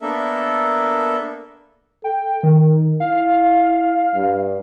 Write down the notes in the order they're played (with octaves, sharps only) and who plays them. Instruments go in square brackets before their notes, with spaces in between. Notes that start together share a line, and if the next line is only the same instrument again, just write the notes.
[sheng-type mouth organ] A#3 B3 D4 A4 A#4 E5
[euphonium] A4 [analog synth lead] G5
[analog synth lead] D#3 [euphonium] A#4
[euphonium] E4 [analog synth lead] F5
[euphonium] G2